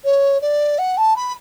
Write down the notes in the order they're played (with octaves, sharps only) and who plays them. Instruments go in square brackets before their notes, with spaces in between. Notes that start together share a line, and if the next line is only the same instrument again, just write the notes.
[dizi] C#5
D5
F#5
A5
B5